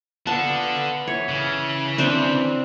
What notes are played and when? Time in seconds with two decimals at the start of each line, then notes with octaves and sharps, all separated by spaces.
0.27 D3 B3 F4 F#5 A5
1.07 E3 C#5
1.29 C#3
1.98 C4 D4 C5